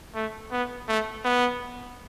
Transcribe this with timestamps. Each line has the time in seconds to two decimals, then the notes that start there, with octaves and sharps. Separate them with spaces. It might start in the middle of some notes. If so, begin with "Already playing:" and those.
0.15 A3
0.52 B3
0.88 A3
1.25 B3